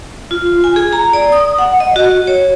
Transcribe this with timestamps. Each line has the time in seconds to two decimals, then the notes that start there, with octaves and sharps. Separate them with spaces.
0.31 F4
0.64 G#5
0.76 G#4
0.93 A#5
1.13 D5
1.32 D#6
1.58 F#5
1.80 D#5
1.96 F#4
2.27 C#5